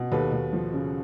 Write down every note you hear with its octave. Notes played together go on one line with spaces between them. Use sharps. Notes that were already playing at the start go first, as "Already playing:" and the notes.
Already playing: B2
D#2 A4 B4
D#2
F3
C#3